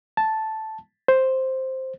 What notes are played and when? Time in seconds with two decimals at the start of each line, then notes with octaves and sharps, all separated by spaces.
0.17 A5
1.08 C5